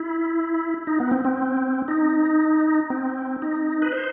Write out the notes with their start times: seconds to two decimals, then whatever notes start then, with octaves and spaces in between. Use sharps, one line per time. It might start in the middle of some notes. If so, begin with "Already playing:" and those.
Already playing: E4
0.87 D#4
1.00 B3
1.11 C4
1.25 C4
1.88 D#4
2.90 C4
3.42 D#4
3.82 B4
3.92 C5